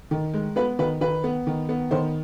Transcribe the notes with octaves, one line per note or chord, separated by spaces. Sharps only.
D#3
G#3
B3 B4
D#3 B4
D#3 B4
B3
D#3
B3
D#3 C5